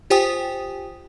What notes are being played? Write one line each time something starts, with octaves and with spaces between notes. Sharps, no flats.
F4 G4 C5 G5 G#5 D#6